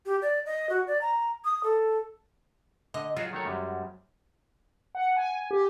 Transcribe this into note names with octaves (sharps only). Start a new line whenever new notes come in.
G4
D5
D#5
F#4
D5
A#5
D#6
A4
D3 D#5
F#3 F4 F#4 G#4
D#3 A3 C#5
F#2 G3 G#3
F#5
G#5
G4